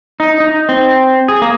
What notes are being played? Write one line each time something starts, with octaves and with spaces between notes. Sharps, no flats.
D#4
D#4
C4
G#4
A#3